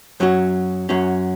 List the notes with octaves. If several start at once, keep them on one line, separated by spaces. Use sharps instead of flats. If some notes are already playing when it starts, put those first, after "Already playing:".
F#2 F#3 C#4 F#4
F#2 F#3 C#4 F#4